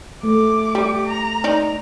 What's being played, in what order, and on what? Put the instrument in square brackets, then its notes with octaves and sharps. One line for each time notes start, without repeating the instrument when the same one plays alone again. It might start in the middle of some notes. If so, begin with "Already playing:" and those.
[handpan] A3 [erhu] D6
[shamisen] G3
[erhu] A#5
[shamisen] D#4 D5